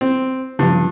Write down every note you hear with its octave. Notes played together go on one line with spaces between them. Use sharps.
C4
G2 C#3 F3